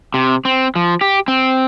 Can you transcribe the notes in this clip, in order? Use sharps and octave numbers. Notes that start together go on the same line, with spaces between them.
C3
C4
F3
G4
C4